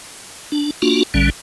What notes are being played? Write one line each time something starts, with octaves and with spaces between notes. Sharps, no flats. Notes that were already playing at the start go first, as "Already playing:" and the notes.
D4
A#3 D4 F4 F#4
A#1 D3 G3 C#4